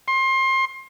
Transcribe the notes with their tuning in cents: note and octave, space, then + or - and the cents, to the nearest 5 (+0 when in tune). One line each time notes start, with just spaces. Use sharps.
C6 +25